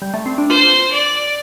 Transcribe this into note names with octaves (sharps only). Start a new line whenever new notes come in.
G3
A3
C4
D4
F4 C5
D5